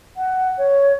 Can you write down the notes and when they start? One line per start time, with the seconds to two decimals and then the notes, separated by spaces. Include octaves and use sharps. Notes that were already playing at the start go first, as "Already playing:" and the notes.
0.17 F#5
0.58 C#5